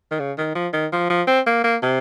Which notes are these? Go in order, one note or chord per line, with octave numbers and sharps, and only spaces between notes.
D#3
C#3
D#3
F3
D#3
F3
F3
C4
A#3
A#3
C3